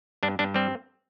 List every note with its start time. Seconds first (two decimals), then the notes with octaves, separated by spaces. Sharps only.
0.23 G2 D4
0.39 G2 D4
0.54 G3 C4